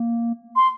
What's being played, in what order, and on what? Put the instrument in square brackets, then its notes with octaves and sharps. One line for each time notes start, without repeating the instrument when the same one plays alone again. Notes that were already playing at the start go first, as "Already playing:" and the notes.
Already playing: [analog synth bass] A#3
[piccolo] C6